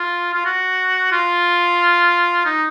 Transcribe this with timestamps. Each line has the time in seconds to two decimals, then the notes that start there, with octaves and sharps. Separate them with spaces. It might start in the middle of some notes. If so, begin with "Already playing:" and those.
Already playing: F4
0.34 F4
0.45 F#4
1.12 F4
2.46 D#4